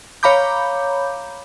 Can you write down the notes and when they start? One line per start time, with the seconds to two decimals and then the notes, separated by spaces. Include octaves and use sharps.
0.23 C#5 F5 A#5 B5 D6 G6